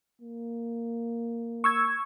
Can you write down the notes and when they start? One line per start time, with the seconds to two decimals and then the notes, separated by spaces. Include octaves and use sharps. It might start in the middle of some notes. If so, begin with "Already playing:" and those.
0.21 A#3
1.64 C#6 E6 G#6